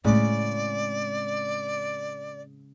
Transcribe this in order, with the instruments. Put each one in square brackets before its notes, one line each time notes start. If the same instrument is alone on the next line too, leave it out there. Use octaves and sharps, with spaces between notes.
[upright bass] A2 C4 [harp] C#3 G#3 C#4 [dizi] D5